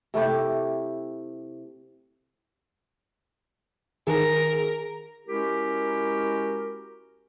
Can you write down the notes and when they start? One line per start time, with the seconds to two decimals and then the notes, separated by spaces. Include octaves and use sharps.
0.14 C3 A3 E4 G4
4.07 D#3 G#4 A#4
5.27 G#3 C#4 E4 F#4 G4 A#4